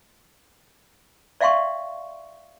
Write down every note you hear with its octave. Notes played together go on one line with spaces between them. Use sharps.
D5 E5 F5 G5 C6 C#6